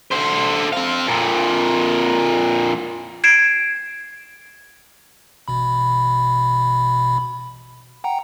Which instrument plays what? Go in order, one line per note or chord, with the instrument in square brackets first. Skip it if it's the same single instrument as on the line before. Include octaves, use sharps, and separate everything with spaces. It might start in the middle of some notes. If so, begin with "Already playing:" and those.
[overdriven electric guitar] D3 C5
C4 F5
F2 A#2
[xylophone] G#6 C7 D7 E7
[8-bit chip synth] A1 B2 B5
F#5 G5 A#5